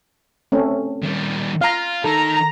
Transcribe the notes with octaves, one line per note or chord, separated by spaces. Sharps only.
A3 C4 C#4
D#3 G3
F4 F5 A#5
D#3 A4 A#5